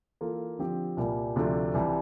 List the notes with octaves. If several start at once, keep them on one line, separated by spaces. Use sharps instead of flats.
E3 A#3 F4 A4
D3 F3 C4 G4
C2 A#2 G3 A#3
D2 C3 F3 A3 D4
C2 C3 E3 G3